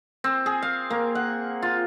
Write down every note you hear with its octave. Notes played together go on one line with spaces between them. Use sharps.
C4
G#4
F5
A#3
F#5
F4